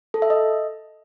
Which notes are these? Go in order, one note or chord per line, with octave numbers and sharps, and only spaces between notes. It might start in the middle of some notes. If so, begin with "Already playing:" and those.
A4
E5
D#5